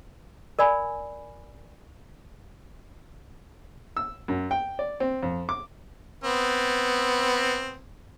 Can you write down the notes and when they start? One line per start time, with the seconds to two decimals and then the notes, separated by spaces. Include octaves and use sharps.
0.59 A#4 D5 G#5 B5
3.97 E6
4.28 F#2
4.51 G5
4.79 D5
5.00 C4
5.23 F2
5.49 D6
6.24 B3 C4